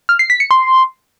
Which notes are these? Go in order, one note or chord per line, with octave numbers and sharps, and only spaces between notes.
F6
C7
B6
C#7
C6